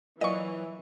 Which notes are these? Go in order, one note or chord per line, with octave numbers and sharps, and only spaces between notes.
A#2 E3 F#3 D#5 C#6